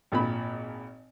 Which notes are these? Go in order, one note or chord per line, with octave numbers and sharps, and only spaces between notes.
G#1 A#2 B5